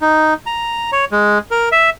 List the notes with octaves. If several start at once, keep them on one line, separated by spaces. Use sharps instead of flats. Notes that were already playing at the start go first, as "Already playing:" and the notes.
D#4
A#5
C#5
G#3
A#4
E5